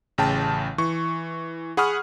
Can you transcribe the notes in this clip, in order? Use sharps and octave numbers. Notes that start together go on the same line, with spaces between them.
A1 C#3 G5 A5
E3 C#6
G#4 F#5 B5 C#6 D#6 F6